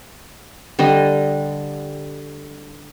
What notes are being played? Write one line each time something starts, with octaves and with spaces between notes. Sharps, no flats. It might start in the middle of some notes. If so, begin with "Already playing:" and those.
D3 G3 D#5